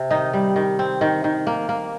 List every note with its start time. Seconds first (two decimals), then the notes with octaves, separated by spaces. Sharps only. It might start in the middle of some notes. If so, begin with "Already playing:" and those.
Already playing: C3
0.10 D#3 D#4
0.33 G3
0.56 D#3
0.79 C4
1.01 D#3
1.24 D#3
1.47 A#3
1.69 A#3